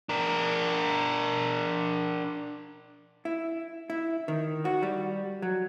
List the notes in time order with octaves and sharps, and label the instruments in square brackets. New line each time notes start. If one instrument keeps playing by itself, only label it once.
[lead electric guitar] D4 A#4
[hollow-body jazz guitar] E4
E4
D#3
F#4
G3
F#3